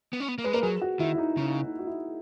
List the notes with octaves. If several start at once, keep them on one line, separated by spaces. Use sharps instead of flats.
B3
C#4
B3
A#3
G#3 B4
A#3 A#4
F#3 G#4
F#4
D#3 E4
E4
D#4
C#3 D#4
D#4
F#4
E4